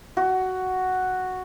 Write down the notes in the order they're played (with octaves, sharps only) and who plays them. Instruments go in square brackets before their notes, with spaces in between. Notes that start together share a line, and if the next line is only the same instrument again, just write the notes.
[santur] F#4